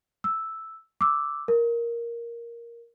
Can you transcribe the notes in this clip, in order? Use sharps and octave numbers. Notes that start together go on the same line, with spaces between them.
E6
D6 E6
A#4